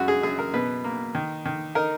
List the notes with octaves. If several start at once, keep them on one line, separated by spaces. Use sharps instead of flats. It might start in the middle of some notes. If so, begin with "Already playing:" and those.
Already playing: F#2 G#3 F#4
G#4
F#2 G#4
A#4
B2 B4
A#3
D#3
D#3
D#4 A#4